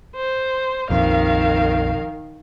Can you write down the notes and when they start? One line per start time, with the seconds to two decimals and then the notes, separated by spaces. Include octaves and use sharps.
0.16 C5
0.90 A#1 F2 D#3 F5